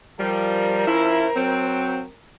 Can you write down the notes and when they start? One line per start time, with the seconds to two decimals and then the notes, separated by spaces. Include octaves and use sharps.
0.20 F3 G3 A#4 C5
0.87 F3 C#4 E4
1.36 F#3 C4